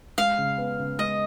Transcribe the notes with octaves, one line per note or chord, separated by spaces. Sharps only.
G#3 F5
C#3
B3
C#3
G#3 D#5